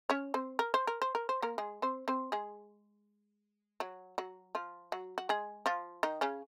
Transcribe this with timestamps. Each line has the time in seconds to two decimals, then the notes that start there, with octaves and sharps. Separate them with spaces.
0.10 C#4 C#5
0.34 C4 C5
0.59 A#4
0.74 C5
0.87 A#4
1.02 C5
1.15 A#4
1.29 C5
1.42 A#3 A#4
1.58 G#3 G#4
1.82 C4 C5
2.08 C4 C5
2.32 G#3 G#4
3.80 F#3 F#4
4.18 F#3 F#4
4.55 F3 F4
4.92 F#3 F#4
5.18 F#4
5.29 G#3 G#4
5.66 F3 F4
6.03 D#3 D#4
6.21 C#3 C#4